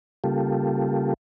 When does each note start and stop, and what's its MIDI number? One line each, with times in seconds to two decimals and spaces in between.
0.24 1.14 49
0.24 1.14 55
0.24 1.14 58
0.24 1.14 65
0.24 1.14 67
0.24 1.14 69